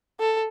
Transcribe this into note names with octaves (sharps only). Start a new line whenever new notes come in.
A4